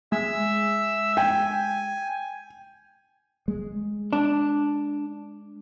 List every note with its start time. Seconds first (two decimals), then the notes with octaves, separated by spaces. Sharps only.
0.12 G#3 E5 E6
1.17 G5 G#5
3.48 G#3
4.13 D4